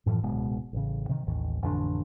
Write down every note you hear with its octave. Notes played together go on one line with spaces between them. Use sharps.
F#2 A2 E3 F3
D1 C#2 B2 G#3
A1 C#3
C3 D#3
A1 D#2 D#3
A1 F2 D3 D4